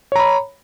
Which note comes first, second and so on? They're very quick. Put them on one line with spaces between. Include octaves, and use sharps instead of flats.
C#5 A#5 B5